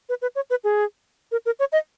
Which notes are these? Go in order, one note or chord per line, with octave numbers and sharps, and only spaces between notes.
B4
B4
C#5
B4
G#4
A#4
A#4
C#5
D#5